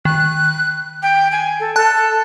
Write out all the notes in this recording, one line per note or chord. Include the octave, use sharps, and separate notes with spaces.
D#3 F#6
G5
G#5
A4
A4 A5 F#6